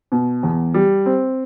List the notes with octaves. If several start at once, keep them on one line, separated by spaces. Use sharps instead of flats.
B2
E2
G3
C4